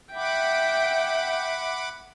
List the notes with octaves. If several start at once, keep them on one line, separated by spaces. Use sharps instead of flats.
E5 F#5 G5 B5 D6